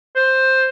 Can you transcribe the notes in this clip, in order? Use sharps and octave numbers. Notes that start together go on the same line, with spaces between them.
C5